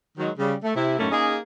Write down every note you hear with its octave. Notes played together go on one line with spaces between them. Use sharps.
D#3 F#3 G#3
C#3 G3
A3
C3 E4
F#2 A2 A3 A#3 C#4 D#4
A#3 C#4 D#4 G#4